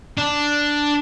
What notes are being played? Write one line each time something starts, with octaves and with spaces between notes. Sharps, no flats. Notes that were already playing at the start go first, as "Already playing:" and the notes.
D4